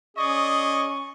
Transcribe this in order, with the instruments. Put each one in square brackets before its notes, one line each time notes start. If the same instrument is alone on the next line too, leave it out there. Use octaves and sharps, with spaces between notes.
[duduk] C#4 [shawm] G#4 [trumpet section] D5 D#5 [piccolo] C#6